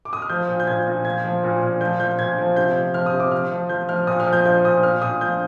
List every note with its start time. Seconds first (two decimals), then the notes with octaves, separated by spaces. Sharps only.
0.05 D6
0.13 D#6
0.22 F6
0.29 F3 G6
0.48 A#2
0.60 G6
0.67 A#2 G#6
0.87 A#2
1.05 F3 G#6
1.25 F3
1.44 A#2
1.62 A#2
1.81 F3 G6
2.00 F3 G6
2.19 A#2 G#6
2.38 F3
2.56 C3 G6
2.76 F3
2.94 F3 F6
3.06 D#6
3.13 C3
3.20 D6
3.32 F3 F6
3.51 F3
3.69 F3 G6
3.89 F3 F6
4.07 A#2 D#6
4.20 F6
4.26 F3
4.33 G6
4.46 F3 G6
4.64 A#2 D#6
4.83 A#2 F6
5.02 A#2 D#6
5.21 F3 G6